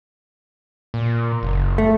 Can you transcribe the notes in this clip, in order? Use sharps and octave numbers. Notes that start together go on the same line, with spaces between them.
A#2
F#1
A3